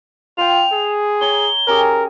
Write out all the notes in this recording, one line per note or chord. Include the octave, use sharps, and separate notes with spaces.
F4 G5 C6 F7
G#4
C#5 A#5 G7
C#4 G4 G#4 A#4